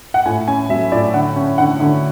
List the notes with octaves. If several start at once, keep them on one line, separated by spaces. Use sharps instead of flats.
F#5
A2 G#5
C#4 G#5
F#3 E5
A2 D5
D3 F#5
C#4
D3 F#5
D3